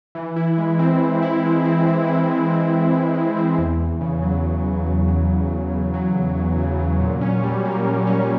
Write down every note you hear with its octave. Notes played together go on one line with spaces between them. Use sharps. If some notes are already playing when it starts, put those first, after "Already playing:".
E3
E4
G#3
C4
E3
E4
G#3
C4
E3
E4
G#3
C4
E3
E4
G#3
C4
E2
E2
C#3
F#3
E2
E2
C#3
F#3
E2
E2
C#3
F#3
E2
E2
C#3
F#3
A#2
C#4
G3
A#3
A#2
C#4